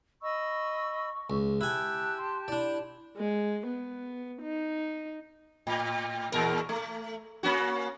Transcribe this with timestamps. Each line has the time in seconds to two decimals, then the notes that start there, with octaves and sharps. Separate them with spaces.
0.22 D#5 B5 C#6 E6
1.30 C#2
1.61 E4 G4 G#5 A5 F#6
2.18 C6
2.48 D4 E4 D5
3.17 G#3
3.67 B3
4.42 D#4
5.67 A2
6.32 E2 A#2 A#4
6.69 A3
7.43 A#3 C#4 F#4